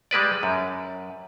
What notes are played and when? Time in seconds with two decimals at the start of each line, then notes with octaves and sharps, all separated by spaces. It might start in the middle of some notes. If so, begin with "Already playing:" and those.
0.11 G3 G#3 B4 D5
0.43 F#2